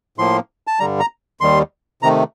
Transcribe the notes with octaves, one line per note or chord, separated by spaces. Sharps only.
A2 F3 A#3 C6
A5
G2 D3 G3 A#5
A#5
D#2 D#3 G3 C6
C3 D#3 A3 A#5